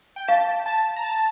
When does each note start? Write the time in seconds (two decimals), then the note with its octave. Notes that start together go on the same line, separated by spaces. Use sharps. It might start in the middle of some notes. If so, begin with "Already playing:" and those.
0.16 G5
0.28 F5 A5
0.66 A5
0.96 A#5
1.04 A5